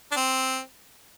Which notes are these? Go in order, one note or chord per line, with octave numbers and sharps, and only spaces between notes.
D4
C4